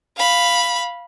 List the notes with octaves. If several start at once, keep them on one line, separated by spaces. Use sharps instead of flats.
F5 B5